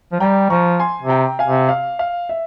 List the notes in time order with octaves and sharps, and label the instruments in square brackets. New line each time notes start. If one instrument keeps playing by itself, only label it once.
[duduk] F3
[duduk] G3 [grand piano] G5 A#5
[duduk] F3 [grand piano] A#5 C#6
[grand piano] G#5 C6
[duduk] C3
[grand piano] G5 A#5
F5 G#5
[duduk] C3
[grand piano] F5
F5
E5